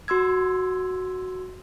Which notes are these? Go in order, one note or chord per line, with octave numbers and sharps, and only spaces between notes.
F#4 C6 E6 G#6